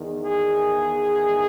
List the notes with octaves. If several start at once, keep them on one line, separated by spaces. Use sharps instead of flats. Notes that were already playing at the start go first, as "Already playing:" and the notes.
Already playing: E2 D#3
G#4